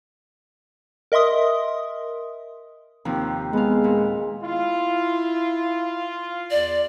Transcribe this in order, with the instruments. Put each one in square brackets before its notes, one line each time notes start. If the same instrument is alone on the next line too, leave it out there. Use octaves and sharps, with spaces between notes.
[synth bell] A#4 D#5 E5 C6 D#6
[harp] D#2 C3 F3
[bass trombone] G#3 [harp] B3 F5
[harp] A#2
[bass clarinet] E4 [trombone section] F4
[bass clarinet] E2 [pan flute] D5